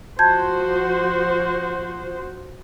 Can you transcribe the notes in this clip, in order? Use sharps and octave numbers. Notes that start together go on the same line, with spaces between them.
F3 F#4 C5 A5 G6 G#6